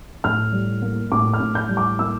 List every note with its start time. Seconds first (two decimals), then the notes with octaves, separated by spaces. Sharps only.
0.24 A2 F6
0.52 G3
0.82 A#3
1.11 A2 D6
1.33 F6
1.40 A2
1.55 G6
1.69 G3
1.77 D6
1.99 A#3 E6